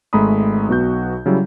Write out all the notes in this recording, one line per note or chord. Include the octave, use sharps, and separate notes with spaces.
G#1 G#3 A3 A#5 B5 D#6
B1 B3 F#4 G6
C#3 F#3 G3 E4